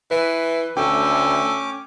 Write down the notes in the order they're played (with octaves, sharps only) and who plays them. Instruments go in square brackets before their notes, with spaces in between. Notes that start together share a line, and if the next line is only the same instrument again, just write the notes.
[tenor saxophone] E3 [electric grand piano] B4
[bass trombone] D2 [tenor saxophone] A3 [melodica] C#4 D6 [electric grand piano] G5